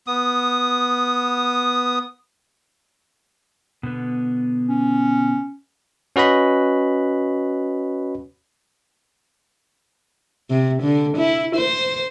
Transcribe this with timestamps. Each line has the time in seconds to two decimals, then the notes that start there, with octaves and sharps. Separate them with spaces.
0.07 B3 D#6
3.83 B2 D3 B3
4.68 C#4
6.16 C#4 F#4 B4 D#5 B5
10.50 C3
10.82 D3
11.17 E4
11.56 C5